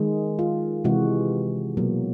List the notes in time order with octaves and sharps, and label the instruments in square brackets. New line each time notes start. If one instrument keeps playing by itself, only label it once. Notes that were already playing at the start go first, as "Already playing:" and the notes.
Already playing: [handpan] D#3 G#3
F4
C3 E3 G#3 F#4
B2 F#3 A#3